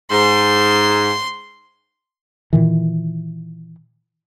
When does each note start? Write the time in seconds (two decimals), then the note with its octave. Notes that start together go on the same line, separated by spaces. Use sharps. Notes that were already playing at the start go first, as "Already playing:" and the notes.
0.11 G#2 C6
2.53 A#2 D#3 E3